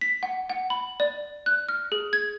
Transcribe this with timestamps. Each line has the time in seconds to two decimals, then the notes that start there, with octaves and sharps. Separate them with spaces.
0.01 B6
0.23 F#5
0.50 F#5
0.70 B5
1.00 D5
1.46 F#6
1.69 F6
1.92 G#4
2.13 G#6